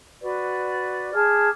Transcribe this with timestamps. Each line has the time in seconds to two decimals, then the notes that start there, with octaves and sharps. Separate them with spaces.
0.21 F#4 B4 D5
1.12 G#4 A5 D6 F6